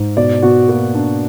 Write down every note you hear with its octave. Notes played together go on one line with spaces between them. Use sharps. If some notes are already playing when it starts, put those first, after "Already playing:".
Already playing: G#2
B2 D5
B2 F#4
A#3 F#4
D4